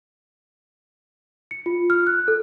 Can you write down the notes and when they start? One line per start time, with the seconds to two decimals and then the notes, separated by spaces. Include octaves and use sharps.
1.51 C#7
1.66 F4
1.90 F6
2.07 F#6
2.28 A4